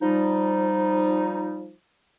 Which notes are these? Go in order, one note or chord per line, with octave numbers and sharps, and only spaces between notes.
F3 G3 D#4